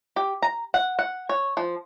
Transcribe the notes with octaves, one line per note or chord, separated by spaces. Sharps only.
G4
A#5
F#5
F#5
C#5
F3